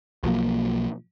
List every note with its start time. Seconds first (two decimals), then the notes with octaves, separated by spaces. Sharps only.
0.23 B1 F3 F#3 A#3